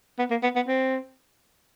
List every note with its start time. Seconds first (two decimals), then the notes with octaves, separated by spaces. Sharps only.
0.19 B3
0.31 A#3
0.43 B3
0.56 B3
0.68 C4